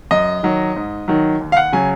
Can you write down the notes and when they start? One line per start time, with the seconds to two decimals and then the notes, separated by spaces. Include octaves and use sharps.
0.11 F#2 D#5
0.43 D#3 F#3
0.76 G#2
1.08 D#3 F#3
1.41 D#2
1.52 F5
1.57 F#5
1.72 C#3 F#3 G#5